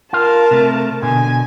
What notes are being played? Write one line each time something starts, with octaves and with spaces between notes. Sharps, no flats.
F4 A#4 F5 A5
C3 A3
B2 D3 G#5